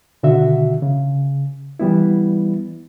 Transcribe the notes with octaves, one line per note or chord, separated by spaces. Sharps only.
B2 D3 D#3 F#4 E5
C#3
E3 G3 B3 E4